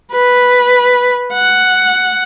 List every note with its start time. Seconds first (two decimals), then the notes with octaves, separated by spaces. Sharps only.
0.12 B4
1.33 F#5